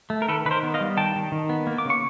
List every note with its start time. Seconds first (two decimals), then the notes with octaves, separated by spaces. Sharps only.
0.10 A3
0.22 A#4
0.28 D#3 A4 B4
0.46 D#3 B4
0.51 A#4 C5
0.63 B3
0.74 D#5 F5
0.81 G3
0.97 D#3 G5 A5
1.16 D#3
1.32 D#3
1.49 B3
1.67 A#3
1.78 D6
1.85 C#3 C#6